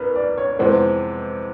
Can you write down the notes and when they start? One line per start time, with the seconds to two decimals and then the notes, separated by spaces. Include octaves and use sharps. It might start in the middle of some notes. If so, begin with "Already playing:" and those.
Already playing: C2 A#4 B4
0.15 D5
0.38 C#5
0.59 F2 C3 E3 G#3 B3 C5